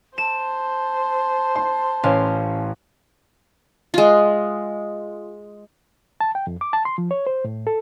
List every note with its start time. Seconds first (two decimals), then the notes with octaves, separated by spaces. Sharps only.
0.18 C5 A5 E7
1.56 C6
2.03 A1 C#4 F5
3.94 G#3 F4
6.21 A5
6.35 G5
6.47 F2
6.61 D6
6.73 A5
6.85 C6
6.98 F3
7.11 C#5
7.27 C5
7.44 A2
7.67 A4